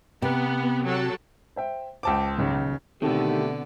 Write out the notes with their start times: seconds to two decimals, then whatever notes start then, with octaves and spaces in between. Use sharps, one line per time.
0.22 C3 B3
0.84 F#3 A4
1.56 C5 E5 G5
2.03 C#2 C5 G5 A5 D6
2.37 D#1 B1 C#3
3.02 B2 D3 D#3 A3 B3 C4 G4 A4